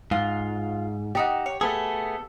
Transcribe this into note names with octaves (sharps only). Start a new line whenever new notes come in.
G#2 F4
D4 D#4 F#4 G4
C#5
A3 B3 G#4 A4